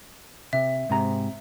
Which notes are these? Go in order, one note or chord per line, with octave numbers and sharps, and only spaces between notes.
C3 E5
G#2 C3 A#5